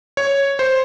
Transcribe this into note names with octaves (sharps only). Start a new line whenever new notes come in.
C#5
C5